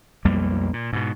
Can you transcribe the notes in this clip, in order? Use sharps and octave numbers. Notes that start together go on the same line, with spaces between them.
B1 F2 G3 A#3
A#2
G#2 B2